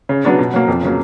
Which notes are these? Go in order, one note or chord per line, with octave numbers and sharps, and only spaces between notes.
C#3
F#3 B3 D4
B2
F#3 A#3
F2
C#3 F#3 A#3